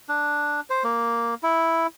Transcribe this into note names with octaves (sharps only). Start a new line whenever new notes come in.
D4
C5
A#3
E4